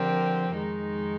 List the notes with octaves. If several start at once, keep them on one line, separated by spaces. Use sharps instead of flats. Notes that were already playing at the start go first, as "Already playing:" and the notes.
Already playing: D3 F3 C4 G4 A#4
F2 D#3 G#3 D#4